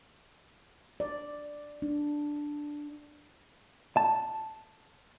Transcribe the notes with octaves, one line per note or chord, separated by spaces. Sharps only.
D5
D4
A5